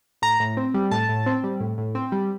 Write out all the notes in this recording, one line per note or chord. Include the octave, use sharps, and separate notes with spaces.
A2 A#5
A2
C4
G3
A2 A5
A2
C4
G3
A2
A2
C4
G3